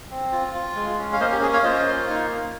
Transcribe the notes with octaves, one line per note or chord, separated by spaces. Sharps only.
C4
F4
F4
G#3
C#4
F5
A#3 C5 D#5
G4
C#4 G#4
C#5 F5
F4 C5 D#5
A#3
D#4